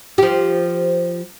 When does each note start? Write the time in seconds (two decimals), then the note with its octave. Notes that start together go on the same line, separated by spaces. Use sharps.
0.18 F3 G4